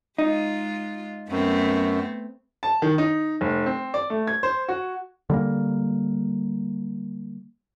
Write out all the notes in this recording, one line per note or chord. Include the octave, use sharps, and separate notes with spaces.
G#3 D#4 F4
F#2 A3 B3 C4
A5
D#3
D#4
F1
C4
D5
A3
G#6
C5
F#4
D3 G3 A3 A#3